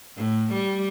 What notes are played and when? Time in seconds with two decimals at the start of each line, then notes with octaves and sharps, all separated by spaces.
0.17 A2
0.53 G3